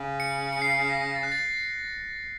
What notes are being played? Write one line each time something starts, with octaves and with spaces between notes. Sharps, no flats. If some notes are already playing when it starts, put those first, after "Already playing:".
Already playing: C#3
C#7
C#7
C7
A#6
A6
F#6
A6